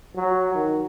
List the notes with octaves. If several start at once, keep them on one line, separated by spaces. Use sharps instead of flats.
F#3
D#3